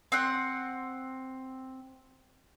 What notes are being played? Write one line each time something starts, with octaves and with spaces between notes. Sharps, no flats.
C4 F#5